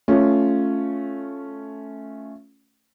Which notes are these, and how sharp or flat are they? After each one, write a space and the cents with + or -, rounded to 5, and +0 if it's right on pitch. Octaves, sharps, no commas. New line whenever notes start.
A3 -10 C#4 +0 F4 -5